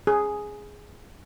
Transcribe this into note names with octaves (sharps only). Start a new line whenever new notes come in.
G#4